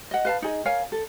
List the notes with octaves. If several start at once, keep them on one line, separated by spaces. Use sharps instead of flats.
D#5 F#5
B4 F5 A5
D#4 G#4 D#5
A#4 C#5 F5 G#5
A4